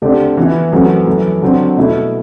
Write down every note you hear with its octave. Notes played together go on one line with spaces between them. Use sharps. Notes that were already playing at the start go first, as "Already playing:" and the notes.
D3 A3 C4 G4 D5
E3 B3 E4
F#2 E3 A3 C4 F#4
F#2 E3 A3
D3 F#3 C4
B2 A3 E4